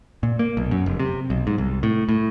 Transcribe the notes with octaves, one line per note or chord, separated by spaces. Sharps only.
A#2
A#3
B1
F#2
F1
C3
B1
G#2
C2
A2
A2